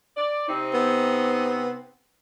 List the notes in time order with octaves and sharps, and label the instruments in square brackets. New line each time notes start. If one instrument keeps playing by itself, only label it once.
[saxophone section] D5
C3 C4 D#4
[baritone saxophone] B3